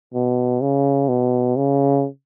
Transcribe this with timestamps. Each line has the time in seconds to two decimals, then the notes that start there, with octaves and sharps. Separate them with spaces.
0.14 B2
0.61 C#3
1.09 B2
1.56 C#3